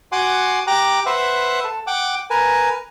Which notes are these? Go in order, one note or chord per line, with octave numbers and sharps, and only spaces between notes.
F#4 F#5 G#5 C6 D6
G4 G5 A#5 D6 F#6
B4 C5 E5 F#5
A4
F#5 G5 D6
A#4 B4 G#5